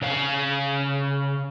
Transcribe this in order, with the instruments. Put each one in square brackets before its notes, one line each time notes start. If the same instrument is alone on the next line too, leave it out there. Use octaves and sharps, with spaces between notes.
[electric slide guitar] C#3 C#5 F5